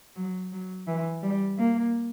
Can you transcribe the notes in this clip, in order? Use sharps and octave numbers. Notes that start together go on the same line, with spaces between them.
F#3
F#3
E3
G3
A#3